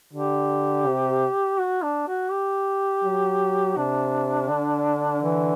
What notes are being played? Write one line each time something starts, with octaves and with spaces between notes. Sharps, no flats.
D3 G4
C3
F#4
D4
F#4
G4
F#3
C3 D4
D3
E3